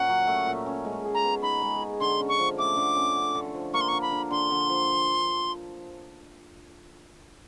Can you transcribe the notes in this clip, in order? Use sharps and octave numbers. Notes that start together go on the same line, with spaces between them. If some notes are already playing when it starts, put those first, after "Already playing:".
Already playing: A#2 C#4 F#5
F#3
A3
A#2
C#4
G#3
G#4
A#5
B3
D#4 B5
G#3
G#4
D3 C6
C#4
C#6
F3
A3 D6
D3
C#4
D3
D3
F3
A#3 C#6
C6
D3 C#6
B5
D3
D3 C6
D3
F3